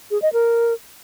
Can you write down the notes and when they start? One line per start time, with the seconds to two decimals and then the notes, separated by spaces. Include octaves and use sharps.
0.11 G#4
0.22 D#5
0.33 A#4